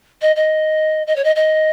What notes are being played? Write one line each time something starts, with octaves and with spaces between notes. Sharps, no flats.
D#5
D#5
D#5
C#5
D#5
D#5